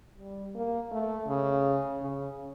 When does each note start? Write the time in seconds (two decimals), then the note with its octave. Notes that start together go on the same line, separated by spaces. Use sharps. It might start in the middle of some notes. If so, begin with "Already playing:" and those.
0.18 G3
0.55 A#3
0.91 A3
1.27 C#3
2.01 C#3